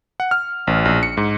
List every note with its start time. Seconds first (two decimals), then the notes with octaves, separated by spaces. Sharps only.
0.20 F#5
0.31 F6
0.67 A1
0.85 A#1
1.03 C#7
1.17 G#2